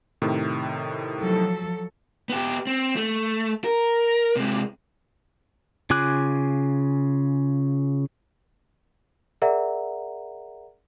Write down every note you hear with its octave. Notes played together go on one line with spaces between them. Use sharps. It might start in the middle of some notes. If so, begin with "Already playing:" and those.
A2 C3 D#3
F3 F#3 A4
B3 G4
C4
A3
A#4
C3 G#3
C#3 F4 G#5 D6 F#6
G#4 A#4 D5 E5 F#5 A#5